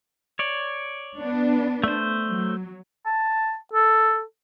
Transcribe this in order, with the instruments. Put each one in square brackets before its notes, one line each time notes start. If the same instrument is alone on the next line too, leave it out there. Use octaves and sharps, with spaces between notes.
[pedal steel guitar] C#5 D5
[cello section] B3 D4
[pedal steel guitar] A3 C5
[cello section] F#3
[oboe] A5
A4